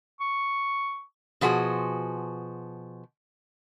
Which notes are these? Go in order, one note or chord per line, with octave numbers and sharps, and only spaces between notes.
C#6
B2 F3 F#4 G#4 G#5